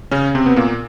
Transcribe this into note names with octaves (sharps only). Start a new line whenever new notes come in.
C#3 C#4
C3 C4
B3
A#2 A#3